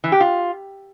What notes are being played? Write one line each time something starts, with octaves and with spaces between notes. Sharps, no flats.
E3
G4
F4